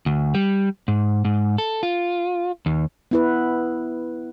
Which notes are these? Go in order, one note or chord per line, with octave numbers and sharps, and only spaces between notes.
D2
G3
G#2
G#2
A4
F4
D#2
B3 E4 B4